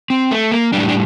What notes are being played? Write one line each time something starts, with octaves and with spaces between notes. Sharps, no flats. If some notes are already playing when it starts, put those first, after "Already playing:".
C4
A3
A#3
A2 G3 D4
D4